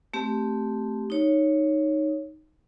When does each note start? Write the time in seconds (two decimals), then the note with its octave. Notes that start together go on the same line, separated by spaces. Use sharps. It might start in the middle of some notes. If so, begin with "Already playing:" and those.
0.14 A3 C4 G4
1.10 D#4 C#5